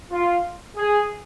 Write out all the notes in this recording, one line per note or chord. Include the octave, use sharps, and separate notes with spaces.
F4
G#4